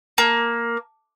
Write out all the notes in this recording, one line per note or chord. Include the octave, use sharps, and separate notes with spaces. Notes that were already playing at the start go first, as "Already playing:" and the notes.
A#3